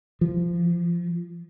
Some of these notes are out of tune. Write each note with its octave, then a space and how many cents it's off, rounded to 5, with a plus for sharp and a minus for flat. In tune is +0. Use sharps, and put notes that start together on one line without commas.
F3 -20